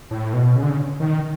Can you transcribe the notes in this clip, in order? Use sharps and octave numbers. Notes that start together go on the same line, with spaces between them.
A2
B2
C#3
D3
C#3
D#3